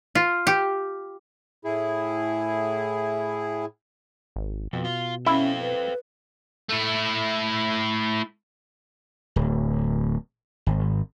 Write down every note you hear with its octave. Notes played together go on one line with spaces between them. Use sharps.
F4
G4
A2 E4 G#4
G#1
F2 B2
F4
C#4 E4 A4 C5 F5
B4
A3 E4
D1
G#1